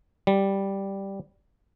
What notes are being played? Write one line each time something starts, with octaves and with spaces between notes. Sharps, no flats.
G3